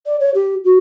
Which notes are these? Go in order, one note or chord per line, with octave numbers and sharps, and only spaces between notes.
D5
C#5
G4
F#4